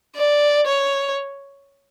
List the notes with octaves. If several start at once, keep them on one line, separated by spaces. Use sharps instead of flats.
D5
C#5